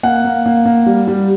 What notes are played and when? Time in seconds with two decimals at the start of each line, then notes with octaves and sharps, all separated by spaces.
0.03 A#3 F#5
0.25 A#3
0.46 A#3
0.66 A#3
0.86 G3
1.08 G3